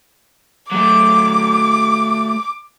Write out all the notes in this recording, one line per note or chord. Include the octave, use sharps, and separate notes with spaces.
F#3 A3 D6